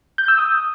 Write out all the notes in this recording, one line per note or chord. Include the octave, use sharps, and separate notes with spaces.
G6
E6
D#6